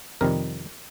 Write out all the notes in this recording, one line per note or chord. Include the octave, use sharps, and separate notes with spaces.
F2 C3 D#3 G3 A#4